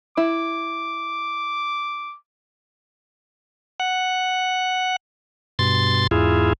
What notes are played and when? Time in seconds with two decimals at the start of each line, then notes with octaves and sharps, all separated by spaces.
0.17 E4 D6
3.80 F#5
5.59 G2 B2 C6 A6
6.11 E2 G#2 E4 F4 G#4